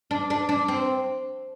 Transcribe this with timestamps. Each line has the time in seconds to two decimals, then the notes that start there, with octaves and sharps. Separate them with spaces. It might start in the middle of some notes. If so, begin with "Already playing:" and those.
0.11 D4
0.30 D4
0.49 D4
0.68 C4